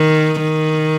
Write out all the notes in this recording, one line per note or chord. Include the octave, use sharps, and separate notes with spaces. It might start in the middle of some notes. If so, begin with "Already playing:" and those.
Already playing: D#3
D#3